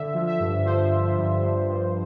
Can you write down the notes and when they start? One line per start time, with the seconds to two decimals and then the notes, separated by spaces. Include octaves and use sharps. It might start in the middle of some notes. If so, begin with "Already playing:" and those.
Already playing: D3 E5
0.14 F3
0.27 E5
0.40 G2
0.65 F3 C5
0.91 F3
1.17 G2
1.42 G2
1.68 G2